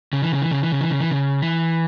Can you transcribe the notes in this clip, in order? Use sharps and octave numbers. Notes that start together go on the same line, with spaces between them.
C#3
E3
C#3
E3
C#3
E3
C#3
E3
C#3
E3
C#3
E3